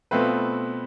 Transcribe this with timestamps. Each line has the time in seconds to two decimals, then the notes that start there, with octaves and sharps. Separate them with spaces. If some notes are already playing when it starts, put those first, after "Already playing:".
0.11 B2 A3 C4 F4 B4